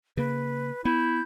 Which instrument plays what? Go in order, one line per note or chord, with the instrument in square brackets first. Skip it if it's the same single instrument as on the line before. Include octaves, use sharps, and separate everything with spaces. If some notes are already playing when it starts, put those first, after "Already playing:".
[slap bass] C#3 A#3 [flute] B4
[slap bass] B3 [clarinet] E4 [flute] G6